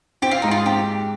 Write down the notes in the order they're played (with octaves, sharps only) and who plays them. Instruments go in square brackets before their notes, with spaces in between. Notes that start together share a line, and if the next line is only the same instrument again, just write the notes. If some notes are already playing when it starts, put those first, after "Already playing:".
[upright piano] C4 [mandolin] G4
[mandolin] F4
[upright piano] G#2 [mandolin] D#4
[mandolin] F4
[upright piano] C4 [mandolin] G4